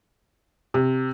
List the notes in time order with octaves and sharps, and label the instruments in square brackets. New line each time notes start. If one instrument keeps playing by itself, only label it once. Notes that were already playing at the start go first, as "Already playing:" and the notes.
[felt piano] C3